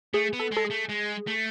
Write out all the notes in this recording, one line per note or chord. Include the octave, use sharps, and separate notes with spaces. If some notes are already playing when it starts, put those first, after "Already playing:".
A3 G#4
B3
A4
G#3 A4
G#4
A3
G#3
A3